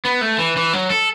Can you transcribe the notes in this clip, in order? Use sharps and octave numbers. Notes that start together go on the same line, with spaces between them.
B3
A3
E3
E3
F#3
A4